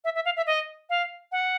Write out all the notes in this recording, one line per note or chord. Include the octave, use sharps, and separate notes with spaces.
E5
E5
F5
E5
D#5
F5
F#5